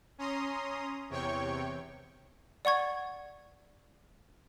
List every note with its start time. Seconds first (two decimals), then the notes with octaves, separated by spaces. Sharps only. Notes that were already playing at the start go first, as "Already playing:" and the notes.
0.18 C#4 A#5 C6 D#6
1.10 E2 C3 C#5 G5 C#6
2.65 D5 F#5 C#6 G#6